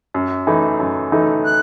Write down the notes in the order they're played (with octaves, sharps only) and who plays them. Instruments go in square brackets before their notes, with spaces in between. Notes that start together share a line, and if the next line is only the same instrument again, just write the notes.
[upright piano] F#2
E3 A3 D#4
F#2
E3 A3 D#4
[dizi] F#6